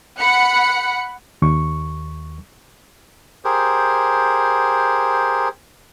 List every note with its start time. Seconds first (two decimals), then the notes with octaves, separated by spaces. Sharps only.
0.19 F#5 B5 F#6 C#7
1.42 D#2 C#6
3.45 G4 G#4 A#4 C5